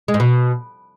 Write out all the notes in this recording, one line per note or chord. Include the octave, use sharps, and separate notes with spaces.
G#3
G#2
B2